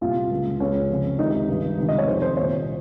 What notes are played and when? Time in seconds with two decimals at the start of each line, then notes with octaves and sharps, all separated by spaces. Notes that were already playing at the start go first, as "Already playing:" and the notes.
0.01 C2 A#2 F4
0.31 C#2 C#3
0.60 C#2 C#3 C#4
0.89 F2 C#3
1.19 C#2 C3 D#3 D#4
1.48 G2 D#3
1.78 C#2 C3 D#3
1.88 D#5
1.98 C#5
2.07 F2 C3 D#3 C5
2.22 C5
2.37 C2 A#2 C#5